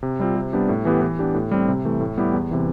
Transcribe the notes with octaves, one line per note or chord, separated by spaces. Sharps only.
C3
G3 C4 F4
C3
G3 B3 D4 G4
A2
E3 B3 E4 G4
E3
B3 D4 G4
A2
G3 C4
C3
E3 A3
A2
G3 B3 E4 G4
E2
C3 E3